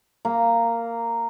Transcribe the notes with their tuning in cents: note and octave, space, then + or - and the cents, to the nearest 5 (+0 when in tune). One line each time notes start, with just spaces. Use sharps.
A#3 -10